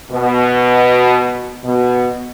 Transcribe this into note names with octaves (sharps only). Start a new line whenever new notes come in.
B2
B2